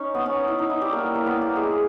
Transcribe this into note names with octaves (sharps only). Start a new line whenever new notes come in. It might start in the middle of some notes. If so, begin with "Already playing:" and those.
Already playing: C#4 D#4
B3
C#4
E4
D#4
E4
G3 G4
A#3 A#4
A#3 A#4
B3 B4
A#3 A#4
G#3 G#4
G#3 G#4